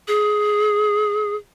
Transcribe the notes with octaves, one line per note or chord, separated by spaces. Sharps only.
G#4